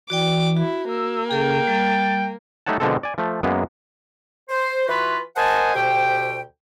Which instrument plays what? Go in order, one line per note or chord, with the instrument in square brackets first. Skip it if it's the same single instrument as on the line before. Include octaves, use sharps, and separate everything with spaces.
[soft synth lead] E3 [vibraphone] F#4 D5 G5 [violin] D6
[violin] E4 [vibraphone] F#4
[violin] A#3 [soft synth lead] E6
[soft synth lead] C#3 [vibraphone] G#4 A4 [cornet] G5
[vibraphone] G3 [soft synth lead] A6
[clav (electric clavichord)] G3 A3 D#4 C#5 F#5 A5
B2 D3 F3 G#3 C4 A4
D5 G#5
F3 A3
F#2 G#3 A#3 B3
[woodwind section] C5
E3 F4 F#4 B4
A#4 C5 D#5 F#5 G#5 A5
D2 B2 G4 C5 G5